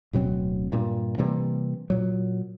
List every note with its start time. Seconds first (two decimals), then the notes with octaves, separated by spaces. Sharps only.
0.13 D1 B2 F#3 C4
0.72 G2 A#2
1.18 C3 E3 G3 A#3
1.90 A#2 F#3